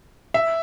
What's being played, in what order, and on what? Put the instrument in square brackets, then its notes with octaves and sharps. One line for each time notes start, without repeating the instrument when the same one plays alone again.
[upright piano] E5